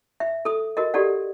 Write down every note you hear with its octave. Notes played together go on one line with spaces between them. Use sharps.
E5
A4 D#6
F#4 A#4 D#5
F#4 G4 A4 D5 F#5